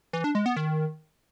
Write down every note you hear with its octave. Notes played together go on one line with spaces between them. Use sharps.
E3
D4
G#3
B3
D#3